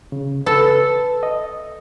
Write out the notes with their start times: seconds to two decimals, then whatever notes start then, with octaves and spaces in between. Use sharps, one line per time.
0.12 C#3
0.46 A4 B4
1.23 D#5